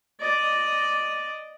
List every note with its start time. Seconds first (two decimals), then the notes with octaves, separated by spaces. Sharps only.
0.20 D5 D#5